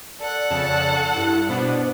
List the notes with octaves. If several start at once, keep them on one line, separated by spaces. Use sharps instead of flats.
A4 D5 F#5
F2 C#3 A5
G2 E4 F#6
B2 B3 D4 C5